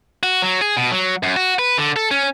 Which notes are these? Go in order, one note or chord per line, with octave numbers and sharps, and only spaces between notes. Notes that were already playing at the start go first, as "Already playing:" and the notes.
F#4
F#3
G#4
B2
F#3
F#2
F#4
B4
D3
A4
C#4